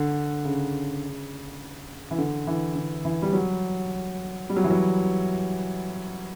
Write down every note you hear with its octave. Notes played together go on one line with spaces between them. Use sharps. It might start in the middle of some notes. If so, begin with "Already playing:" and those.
Already playing: D3
C#3
E3
D3
E3
D3
E3
G3
F#3
G3
F#3
E3
F#3